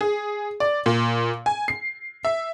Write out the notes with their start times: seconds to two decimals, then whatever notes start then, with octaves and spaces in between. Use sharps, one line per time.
0.01 G#4
0.60 D5
0.86 A#2
1.46 G#5
1.68 C7
2.25 E5